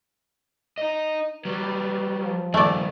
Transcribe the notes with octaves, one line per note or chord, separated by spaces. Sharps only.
D#4 D#5
F#3 G3 B4
F3
G2 D#3 A3 D5